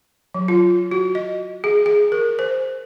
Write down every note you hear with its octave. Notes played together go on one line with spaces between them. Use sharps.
F#3
F4
F#4
D#5
G#4
G#4
A#4
C5